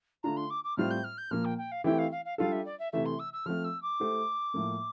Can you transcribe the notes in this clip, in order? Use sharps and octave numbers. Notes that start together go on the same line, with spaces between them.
D3 A3 D4 F4 A#5
C6
D6
D6
A2 G3 C4 F4 C5 F6
G6
F6
G6
A#2 F3 A#3 F6
G5
G5
F5
E3 A3 C4 E4 G4 G5
F5
F5
F5
G3 D4 F4 A4 F5
E5
D5
E5
C3 E3 A3 E5
C6
E6
E6
F3 A3 C4 F6
E6
D6
A3 E4 G4 C5
A2 F3 A#3